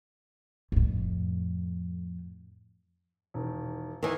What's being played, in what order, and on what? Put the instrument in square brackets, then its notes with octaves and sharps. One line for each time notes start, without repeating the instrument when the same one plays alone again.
[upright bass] F2 A2
[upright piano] E1 D#3
[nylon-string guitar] D#3 E3